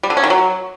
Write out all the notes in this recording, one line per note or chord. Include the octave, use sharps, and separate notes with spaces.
G3
D3
C#4
D#3
F#3